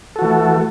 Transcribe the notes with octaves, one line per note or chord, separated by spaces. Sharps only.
E3 A3 F#4 A4